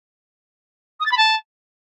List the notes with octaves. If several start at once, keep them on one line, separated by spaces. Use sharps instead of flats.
D#6
A6
B5
A5